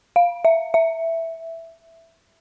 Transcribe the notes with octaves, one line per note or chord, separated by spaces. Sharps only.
F5
E5
E5